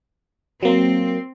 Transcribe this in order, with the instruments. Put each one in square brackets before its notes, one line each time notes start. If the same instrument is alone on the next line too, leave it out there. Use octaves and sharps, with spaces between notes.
[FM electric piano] F#3 A#3 [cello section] C4